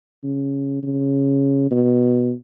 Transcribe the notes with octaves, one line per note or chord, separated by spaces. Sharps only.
C#3
C#3
B2